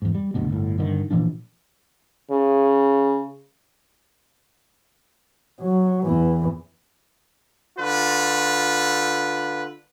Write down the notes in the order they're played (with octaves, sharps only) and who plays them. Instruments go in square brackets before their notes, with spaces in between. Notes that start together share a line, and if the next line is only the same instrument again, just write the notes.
[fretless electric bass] E2 G#2
G3
F#1 D2 B2
G1 A2
G2 D3 D#3
A#2 E3 F3 D4
[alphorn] C#3
[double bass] F#3
E2 E3
[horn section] D3 F4 B4